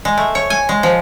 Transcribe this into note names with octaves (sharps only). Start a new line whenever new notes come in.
G#3
A3
C#5
G#5
G#3
F3